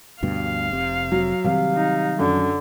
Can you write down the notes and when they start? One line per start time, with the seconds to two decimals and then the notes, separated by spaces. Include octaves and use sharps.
0.22 D2 G2 B2 F5
0.73 F1 C3
1.12 F#3
1.44 C3 D#3 F#3 G3 F5
1.75 D#4
2.19 F#2 D3